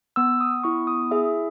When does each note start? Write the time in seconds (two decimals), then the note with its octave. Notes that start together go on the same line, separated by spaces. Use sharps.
0.16 B3 E6
0.40 D#6
0.64 E4 C#6
0.87 D#6
1.11 G#4 E5